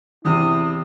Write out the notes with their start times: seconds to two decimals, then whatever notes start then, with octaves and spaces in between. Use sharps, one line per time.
0.25 E2 C3 E4 D#6